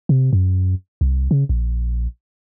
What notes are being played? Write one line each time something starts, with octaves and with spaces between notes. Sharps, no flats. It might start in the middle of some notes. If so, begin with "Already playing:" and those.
C3
F#2
C2
C#3
A#1